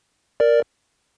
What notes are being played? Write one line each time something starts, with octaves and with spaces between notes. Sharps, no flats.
A#4 D5